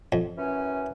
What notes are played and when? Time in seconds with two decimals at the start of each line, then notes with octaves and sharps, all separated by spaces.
0.12 F2
0.37 F#2 E3 C#4